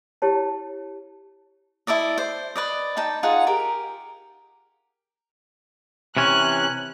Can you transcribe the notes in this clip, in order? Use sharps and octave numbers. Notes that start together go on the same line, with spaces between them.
E4 G4 C#5 A5
E4 A4 D5 D#5
C5
B4 D5 D#5
D#4 G5 A5
D#4 F4 G#4 F#5
G4 G#4 A#4
C3 E3 C#4 F#6